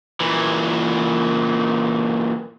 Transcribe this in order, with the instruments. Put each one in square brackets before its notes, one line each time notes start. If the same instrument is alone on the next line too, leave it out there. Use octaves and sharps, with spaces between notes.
[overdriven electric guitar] A#2 E3